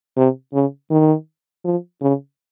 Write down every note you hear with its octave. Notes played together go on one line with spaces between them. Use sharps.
C3
C#3
D#3
F3
C#3